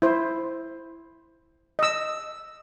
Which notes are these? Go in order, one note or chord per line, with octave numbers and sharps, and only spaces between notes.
E4 C5
D#5 E6